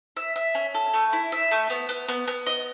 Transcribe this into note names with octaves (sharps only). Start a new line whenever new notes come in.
E5
E5
C#4
A4
A3
E4
E5
A3
B3
B3
B3
B3
D#5